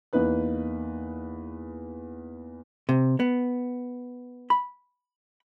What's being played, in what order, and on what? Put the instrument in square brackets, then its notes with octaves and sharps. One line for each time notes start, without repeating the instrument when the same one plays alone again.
[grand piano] E2 A#3 D#4 B4 F#6
[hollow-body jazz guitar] C3
B3
B5